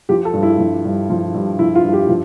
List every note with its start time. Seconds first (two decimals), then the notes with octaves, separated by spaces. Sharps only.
0.09 F3 G4
0.25 A4
0.34 G2
0.43 E4
0.59 F3
0.85 G2
1.10 F3
1.34 G2
1.59 F3 E4
1.75 F4
1.84 G2
1.93 G4
2.09 F3